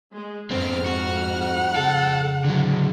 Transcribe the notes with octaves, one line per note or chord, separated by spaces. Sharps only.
G#3
F2 G#2 B3 C4 F6
F#4 F#5
C#3 A4
D3 F#3